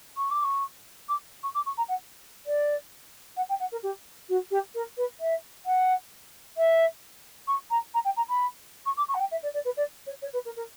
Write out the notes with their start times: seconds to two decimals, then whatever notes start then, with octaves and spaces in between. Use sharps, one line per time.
0.17 C#6
0.30 D6
0.42 C#6
1.08 D6
1.43 C#6
1.54 D6
1.65 C#6
1.77 A#5
1.88 F#5
2.46 D5
3.36 F#5
3.49 G5
3.59 F#5
3.71 A#4
3.82 G4
4.29 F#4
4.50 G4
4.74 A#4
4.97 B4
5.20 E5
5.65 F#5
6.57 E5
7.47 C#6
7.70 A#5
7.94 A#5
8.04 G5
8.16 A#5
8.28 B5
8.85 C#6
8.96 D6
9.08 C#6
9.14 F#5
9.19 G5
9.31 E5
9.42 D5
9.53 D5
9.64 B4
9.76 D5
10.06 C#5
10.21 C#5
10.33 B4
10.45 A#4
10.56 A#4